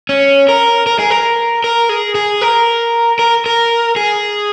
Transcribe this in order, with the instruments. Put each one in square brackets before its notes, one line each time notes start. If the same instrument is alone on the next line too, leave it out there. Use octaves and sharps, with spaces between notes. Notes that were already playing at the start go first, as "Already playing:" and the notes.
[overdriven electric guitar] C#4
A#4
A#4
G#4
A#4
A#4
G#4
G#4
A#4
A#4
A#4
G#4